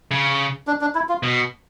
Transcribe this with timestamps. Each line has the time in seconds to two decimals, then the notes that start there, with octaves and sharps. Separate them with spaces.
0.11 C#3
0.67 D4
0.81 D4
0.95 E4
1.09 F4
1.23 B2